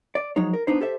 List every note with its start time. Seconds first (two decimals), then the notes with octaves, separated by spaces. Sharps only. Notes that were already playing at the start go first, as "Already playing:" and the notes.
0.15 D5
0.36 F3 F#3 G#3 D#4 C#5
0.53 A#4
0.67 B3 D4 D#4 C5
0.80 G4 A4 C5 E5